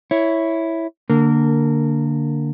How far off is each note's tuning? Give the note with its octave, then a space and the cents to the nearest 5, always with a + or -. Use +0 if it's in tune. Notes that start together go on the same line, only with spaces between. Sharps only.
E4 +0 C#5 +0
D3 +0 A#3 -15 A#4 -20